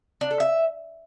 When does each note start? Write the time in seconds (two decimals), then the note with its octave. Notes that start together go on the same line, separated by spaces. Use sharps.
0.21 D4
0.31 A4
0.40 E5